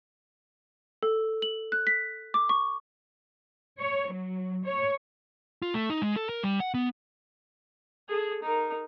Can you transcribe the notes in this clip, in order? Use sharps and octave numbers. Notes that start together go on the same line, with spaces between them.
A4
F#7
F#6
B6
D6
C#6
C#5
F#3
C#5
F4
A3
D#4
G#3
A4
A#4
G3
F#5
B3
G#4 A4
D#4 A#4